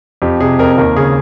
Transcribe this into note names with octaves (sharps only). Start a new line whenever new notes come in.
F2 G4
C3 G#4
F2 A#4
D#2 A#4
C#3 G#4